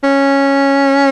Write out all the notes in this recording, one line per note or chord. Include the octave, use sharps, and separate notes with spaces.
C#4